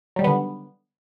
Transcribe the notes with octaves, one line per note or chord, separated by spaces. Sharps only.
D3 D#3 F#3 G3 B3